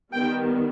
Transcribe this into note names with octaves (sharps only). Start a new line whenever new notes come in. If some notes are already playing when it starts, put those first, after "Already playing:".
D#3 G3 B3 G5